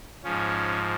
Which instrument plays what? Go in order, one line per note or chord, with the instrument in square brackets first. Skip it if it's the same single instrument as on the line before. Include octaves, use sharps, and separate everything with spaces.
[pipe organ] G#2 F3 C#4